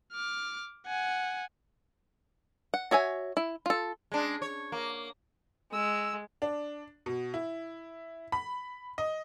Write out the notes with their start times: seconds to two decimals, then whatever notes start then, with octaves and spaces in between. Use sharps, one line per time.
0.13 D6 F6
0.86 F#5 G#5
2.74 F#5
2.91 F#4 C#5 E5 G#5
3.37 E4
3.66 F4 A4
4.12 G#3 D4
4.42 C#5
4.72 A#3
5.73 G#3 E6
6.42 D4
7.06 B2
7.34 E4
8.32 B5
8.98 D#5